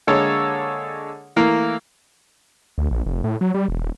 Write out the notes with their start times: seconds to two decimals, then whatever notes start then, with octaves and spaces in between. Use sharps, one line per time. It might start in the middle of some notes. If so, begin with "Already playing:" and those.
0.07 D3 G#3 A#3 A4 C#5
1.36 E3 A3 A#3 A#4
2.78 D2
2.91 A#1
3.06 F1
3.24 A2
3.41 F#3
3.54 G3
3.68 E1
3.82 D#1